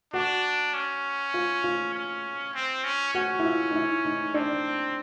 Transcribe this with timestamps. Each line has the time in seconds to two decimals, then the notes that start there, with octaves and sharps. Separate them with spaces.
0.13 D4 F#4
0.74 C#4
1.34 F4
1.64 F4
1.95 C#4
2.54 C4
2.84 C#4
3.14 C#4 F#4
3.39 E4
3.45 F4
3.71 D#4
3.75 E4
4.05 D#4
4.34 C4 D4